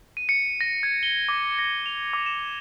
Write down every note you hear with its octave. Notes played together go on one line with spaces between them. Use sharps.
D#7
C#7
A#6
G#6
G7
D6
A#6
F7
D6
E7